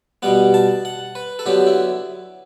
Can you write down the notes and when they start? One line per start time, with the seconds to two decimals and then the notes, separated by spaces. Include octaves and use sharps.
0.22 B2 G3 B3 F#5
0.54 A5
0.85 F#5
1.15 B4
1.39 A4
1.46 D3 F#3 B3 G4
1.67 E4